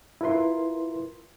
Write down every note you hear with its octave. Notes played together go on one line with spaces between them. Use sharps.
E4 F4 A#4 B4 C6